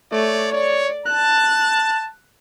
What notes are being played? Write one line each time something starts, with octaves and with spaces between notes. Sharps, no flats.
A3 C#5 D5
C#5 D5
A5 F#6